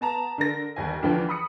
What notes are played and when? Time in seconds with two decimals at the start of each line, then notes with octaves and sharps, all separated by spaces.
0.01 B3 A5 A#5
0.38 D3 A#4 A#6
0.76 G1 D#2 G#5
1.02 E2 D3 E3 F3 G5 G#5
1.29 B5 D#6 C#7